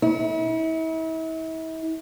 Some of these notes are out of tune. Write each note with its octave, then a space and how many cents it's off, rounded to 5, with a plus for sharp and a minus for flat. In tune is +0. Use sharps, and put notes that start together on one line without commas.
E4 -40